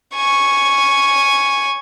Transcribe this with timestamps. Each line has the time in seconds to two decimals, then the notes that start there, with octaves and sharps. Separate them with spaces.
0.16 G#5 C#6